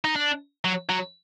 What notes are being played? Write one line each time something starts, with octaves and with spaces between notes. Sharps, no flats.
D#4
D4
F#3
F#3